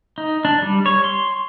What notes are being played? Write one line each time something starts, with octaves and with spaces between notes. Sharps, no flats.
D#4
D4
G3
C#5
C6